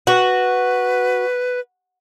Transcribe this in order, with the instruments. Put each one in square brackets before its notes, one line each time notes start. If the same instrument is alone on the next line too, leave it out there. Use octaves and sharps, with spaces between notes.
[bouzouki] F#4 [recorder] B4